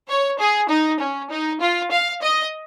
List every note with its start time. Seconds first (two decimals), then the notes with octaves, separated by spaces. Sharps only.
0.08 C#5
0.39 G#4
0.69 D#4
1.00 C#4
1.30 D#4
1.60 F4
1.91 F5
2.22 D#5